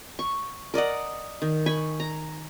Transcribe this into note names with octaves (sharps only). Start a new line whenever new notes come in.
C#6
A#4 D5 D#5 F#5
D#3
G#5 B5 C#6
A#5